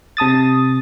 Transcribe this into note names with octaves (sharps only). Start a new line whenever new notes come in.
C3 A5 D#6 A6